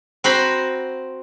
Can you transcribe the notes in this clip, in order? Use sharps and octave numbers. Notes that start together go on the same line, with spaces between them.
C4 F#4 C5 A#5 B5